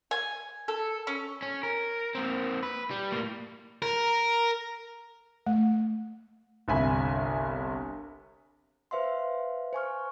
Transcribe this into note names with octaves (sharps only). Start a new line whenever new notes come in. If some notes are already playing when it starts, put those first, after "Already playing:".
G#5
A4
C#4
C#4
A#4
A#3 C4
B4
G3
A2 A#3
A#4
A3
G1 C2 E5 G#5 B5
B4 C5 E5 F5 C6
C5 G#5 C#6 F6